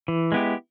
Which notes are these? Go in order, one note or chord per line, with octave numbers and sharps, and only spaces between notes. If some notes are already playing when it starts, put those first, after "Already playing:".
E3
G#3 B3 E4 G4